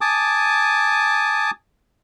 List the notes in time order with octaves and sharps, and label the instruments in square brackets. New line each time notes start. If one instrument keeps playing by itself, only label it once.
[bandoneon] G#5 A5 D6 D#6